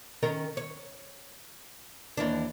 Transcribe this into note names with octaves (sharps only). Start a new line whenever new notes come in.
D#3 C#4 A#4
C#5
D#2 E3 D4